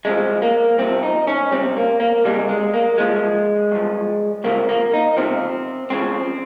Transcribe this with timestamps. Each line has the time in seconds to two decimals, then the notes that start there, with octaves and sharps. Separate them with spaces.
0.05 C2 C3 F3 G#3
0.42 A#3
0.78 C2 C3 F3 C4
1.03 D#4
1.27 C#4
1.51 C#2 C3 G3 C4
1.77 A#3
2.00 A#3
2.24 C#2 C3 G3 G#3
2.49 G#3
2.74 A#3
2.98 G2 F3 G#3
3.72 G2 F3
4.44 C#2 C3 F3 A#3
4.69 A#3
4.93 D#4
5.17 C#2 C3 F3 C4
5.90 C#2 C#3 F3 C4